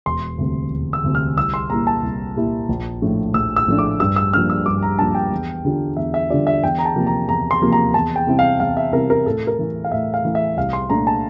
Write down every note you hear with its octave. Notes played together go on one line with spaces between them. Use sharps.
E1 C6
D2 C3 G3
E1
E6
D2 C3 G3
F6
C2 E6
C6
A#2 G3 A#3 E4 A#5
A5
C2
A#2 G3 A#3 E4
A#1
A2 F3 A3 D4
A#1 E6
E6
A2 F3 A3 D4
D6
G2 E6
E6
F3 A#3 D4 F6
E6
G2 D6
A#5
F3 A#3 D4 A5
G5
E2
D3 G3 D4 F4
E2 E5
E5
D3 G3 D4 F4 D5
E5
E2 G5
A#5
A5
C3 F3 A#3
A#5
E2 A#5
C6
C3 F3 A#3
A#5
E2 A5
G5
C3 G3 C4 E4
F5
E2 F5
E5
C3 G3 C4 E4 A#4
A#4
A2 A4
A#4
E3 A3
F5
A2 E5
F5
E3 A3
E5
C2 F5
C6
A#2 A3 D4 A#5
A5